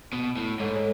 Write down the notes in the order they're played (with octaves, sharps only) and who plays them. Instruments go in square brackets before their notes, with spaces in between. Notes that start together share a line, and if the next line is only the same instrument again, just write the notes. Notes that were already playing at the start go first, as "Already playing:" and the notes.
[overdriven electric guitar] B2
A2
[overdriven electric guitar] G#2 [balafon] A4 C#5
[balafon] A4 C#5